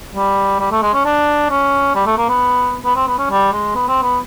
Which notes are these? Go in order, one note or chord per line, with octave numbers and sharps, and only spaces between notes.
G3
G3
A3
G#3
C#4
D4
C#4
G3
A3
A#3
B3
B3
C4
B3
C#4
G3
G#3
B3
C4
B3